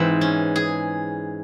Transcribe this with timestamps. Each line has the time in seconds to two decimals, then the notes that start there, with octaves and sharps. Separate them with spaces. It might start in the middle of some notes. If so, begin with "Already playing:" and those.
Already playing: G#2 E3 C4
0.21 C#4
0.56 G#4